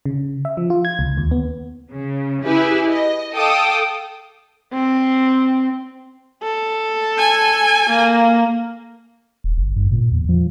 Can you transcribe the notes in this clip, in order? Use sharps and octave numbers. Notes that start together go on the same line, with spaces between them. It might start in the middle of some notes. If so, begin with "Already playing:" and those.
C#3
E5
F3
F4
G#6
C#2
D#2
B3
C#3
E4 G4 G#4 B4 E5
D#5
A4 F5 G5 D6 D#6
C4
A4
G#5
A#3
D#1
G1
G2
A#2
E2
F3